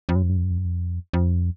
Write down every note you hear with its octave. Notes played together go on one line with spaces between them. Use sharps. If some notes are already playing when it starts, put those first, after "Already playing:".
F2
F#2
F2
F#2
F2
F#2
F2
F#2
F2
F2